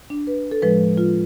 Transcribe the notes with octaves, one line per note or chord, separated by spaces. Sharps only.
D4
B4
A4
A2 F3 G#3 B4
F4